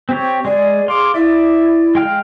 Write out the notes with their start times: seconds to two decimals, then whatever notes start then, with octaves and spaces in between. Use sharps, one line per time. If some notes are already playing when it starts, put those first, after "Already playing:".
0.09 C4 G4 C#5
0.45 G#3 G#4 D5
0.88 G#4 F5 C6 D6
1.14 E4 D5 E5
1.95 G#3 F5 G5 F6